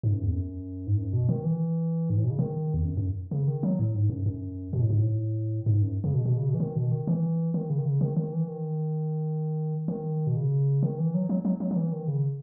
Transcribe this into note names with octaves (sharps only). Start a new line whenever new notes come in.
G#2
F#2
E2
F#2
G#2
F#2
B2
D#3
E3
G#2
A2
B2
C#3
D#3
E2
F#2
F#2
C#3
D#3
F#3
A2
G#2
F#2
F#2
B2
A2
G#2
A2
G#2
F#2
C#3
B2
B2
C#3
B2
E3
D#3
B2
D#3
E3
D#3
C#3
D#3
C#3
D#3
D#3
E3
D#3
D#3
B2
C#3
D#3
E3
F#3
F#3
F#3
F#3
F#3
E3
D#3
C#3